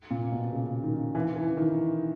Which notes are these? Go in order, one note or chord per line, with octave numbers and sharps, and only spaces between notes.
A#2
B2
C#3
D#3
E3
E3
D#3